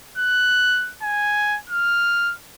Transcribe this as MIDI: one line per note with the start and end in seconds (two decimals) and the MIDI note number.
0.18 0.92 90
1.02 1.58 80
1.70 2.34 89